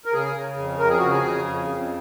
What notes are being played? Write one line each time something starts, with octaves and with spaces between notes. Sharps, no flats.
A#4
C#3 G#4
C#3
F2
F2 A#4
G#4
C#3 F#4
G#4
C#3
F2
F2